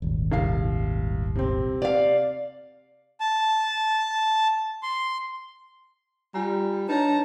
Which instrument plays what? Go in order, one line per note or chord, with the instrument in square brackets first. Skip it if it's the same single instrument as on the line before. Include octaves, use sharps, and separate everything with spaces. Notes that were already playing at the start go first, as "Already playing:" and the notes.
[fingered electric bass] D#1 G#1
[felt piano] C2 F5 C7
C3 C4
[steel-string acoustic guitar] D5 F5
[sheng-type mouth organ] A5
C6
[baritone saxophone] G3 [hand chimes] F4 G#5 A#5
[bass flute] D4 [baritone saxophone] D#4 [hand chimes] B4 C#5 [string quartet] A5 A#5